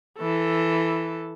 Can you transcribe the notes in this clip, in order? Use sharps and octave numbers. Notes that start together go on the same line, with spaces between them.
E3 A4